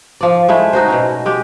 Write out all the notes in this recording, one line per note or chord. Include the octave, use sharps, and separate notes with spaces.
F3 D5
G#3 A3 E4
D#4 F#4 C5
B2 C#4
G#3 G4